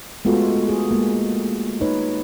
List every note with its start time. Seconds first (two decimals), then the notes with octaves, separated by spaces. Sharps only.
0.25 G#3 A3 B3 F4 F#4 A4
0.69 G#4
0.91 G#3 A#3
1.81 D#4 B4 C#5